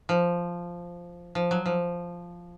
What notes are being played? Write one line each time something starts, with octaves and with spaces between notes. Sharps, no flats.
F3
F3
F#3
F3